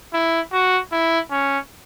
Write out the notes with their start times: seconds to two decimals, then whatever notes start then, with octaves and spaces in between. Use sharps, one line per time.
0.13 E4
0.52 F#4
0.92 E4
1.31 C#4